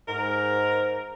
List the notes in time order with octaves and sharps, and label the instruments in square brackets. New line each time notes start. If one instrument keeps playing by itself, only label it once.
[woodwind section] G#2 [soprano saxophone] A#4